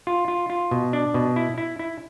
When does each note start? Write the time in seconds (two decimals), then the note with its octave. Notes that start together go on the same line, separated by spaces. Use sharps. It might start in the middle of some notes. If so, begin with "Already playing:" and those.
0.07 F4
0.28 F4
0.50 F4
0.71 B2
0.93 D4
1.14 B2
1.36 E4
1.58 E4
1.79 E4